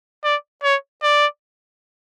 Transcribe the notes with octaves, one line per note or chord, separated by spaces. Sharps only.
D5
C#5
D5